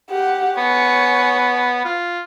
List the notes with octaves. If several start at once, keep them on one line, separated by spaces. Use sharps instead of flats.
G4 F#5
B3 C#5 G#5
F4